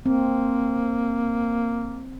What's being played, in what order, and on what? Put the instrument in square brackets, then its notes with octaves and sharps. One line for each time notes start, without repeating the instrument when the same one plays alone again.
[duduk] A#3 [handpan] C4